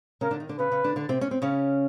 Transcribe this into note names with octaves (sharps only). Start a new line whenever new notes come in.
C#3 C#4 A#4
D3 D4
D#3 D#4
D3 D4
C#3 C#4 B4
C#3 C#4
D3 D4
D3 D4
C3 C4
C#4
C4
C#3 C#4